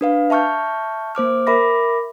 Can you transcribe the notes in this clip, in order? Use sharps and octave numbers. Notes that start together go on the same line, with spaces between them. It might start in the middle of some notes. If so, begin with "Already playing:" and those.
D4 B4 F5
E5 A5 C#6 F6 G6
A#3 C5 D6 F6
A#4 E5 B5 D6 A#6